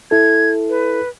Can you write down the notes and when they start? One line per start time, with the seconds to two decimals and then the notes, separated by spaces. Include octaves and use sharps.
0.11 E4 A4 G#6
0.69 B4